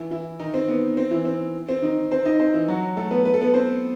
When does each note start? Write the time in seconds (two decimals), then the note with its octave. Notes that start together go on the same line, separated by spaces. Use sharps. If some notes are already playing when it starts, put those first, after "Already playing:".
Already playing: E3 E4
0.11 E3 E4
0.40 D#3 D#4
0.54 C4
0.68 B3
0.97 C4
1.11 E3 E4
1.25 C4
1.69 C4
1.82 D#3 D#4
2.11 C4 C5
2.25 D#4 D#5
2.39 C4 C5
2.54 E3 E4
2.68 F#3 F#4
2.97 A3 A4
3.11 B3 B4
3.25 B4
3.34 A4
3.41 B3 B4
3.54 C4 C5